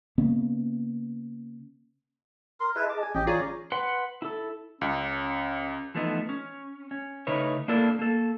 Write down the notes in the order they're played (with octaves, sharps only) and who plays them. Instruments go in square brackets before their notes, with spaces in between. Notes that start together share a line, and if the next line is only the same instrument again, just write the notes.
[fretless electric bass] C#3 A#3 B3 C#4
[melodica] A#4 C6
[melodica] E4 B4 [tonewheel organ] G#4 D#5 A5
[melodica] D6
G#5
[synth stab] A1 [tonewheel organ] E3 C#4 [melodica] G4 D#5 G5
[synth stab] F4 G#4 [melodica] C#5 D5 A#5
[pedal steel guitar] B4 F#5 C6
E4 A4
[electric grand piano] C#2 [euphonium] C#4
[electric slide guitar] E3 F3 A3 B3 D#4
C#4
C#4
C#3 A3 D#4 E4 B4 C#5
A#3 D4 E4 A4 A#4
A#3 A4